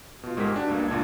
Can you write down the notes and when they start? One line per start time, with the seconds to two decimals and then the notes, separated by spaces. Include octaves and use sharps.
0.23 B2 F4
0.36 G1 G#2 G#3 G4 A#4 B6
0.53 D4 F#4
0.68 C#2 G2 A#3
0.88 C#2 A#2 D4 G#6